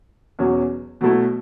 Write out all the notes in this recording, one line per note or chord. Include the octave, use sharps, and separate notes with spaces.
E2 B2 F#3 C#4
B2 F#3 A3 E4